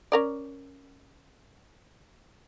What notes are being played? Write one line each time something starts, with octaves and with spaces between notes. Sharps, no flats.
C#4 A#4 D5